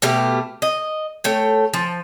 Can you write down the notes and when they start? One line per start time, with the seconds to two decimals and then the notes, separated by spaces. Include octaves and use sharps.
0.02 B2 A3 G4 F5
0.62 D#5
1.24 A3 C#5 G5
1.73 F3